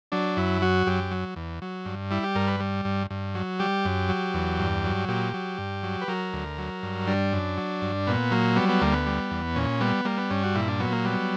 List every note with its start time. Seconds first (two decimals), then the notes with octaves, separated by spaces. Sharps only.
0.12 F#3 D4
0.37 F#2 E4
0.62 F#3 F#4
0.87 F#2 G4
1.11 F#3
1.36 E2
1.62 F#3
1.85 G2
2.11 G3 E4
2.24 G4
2.35 G2 A#4
2.48 B4
2.60 G3
2.85 G2
3.10 G2
3.35 F#3
3.60 G3 G4
3.85 F#2
4.09 F#3
4.34 E2
4.59 G2
4.84 F#3
5.08 A#2 G4
5.34 F#3
5.58 G2
5.83 F#3
6.01 B4
6.08 F#3 A#4
6.33 D2
6.58 F#3
6.83 G2
7.07 G3 D4
7.33 F#2
7.58 F#3
7.82 G2
8.07 A#2 B3
8.31 F#3 A#3
8.56 G3 B3
8.69 B3
8.81 D2 A#3
8.93 B3
9.06 G3
9.31 E2
9.55 A#2 C#4
9.81 G3 B3
10.05 G3 A#3
10.18 B3
10.30 G2 C#4
10.43 F#4
10.55 A#2 E4
10.68 D4
10.80 F#3 B3
10.92 A#3
11.05 G3 B3